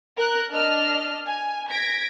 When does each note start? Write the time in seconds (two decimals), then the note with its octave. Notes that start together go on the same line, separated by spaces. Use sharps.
0.17 A#4 F#6
0.51 D4 D#5 A5 F6
1.27 G#5
1.71 G#6 A#6 B6 D7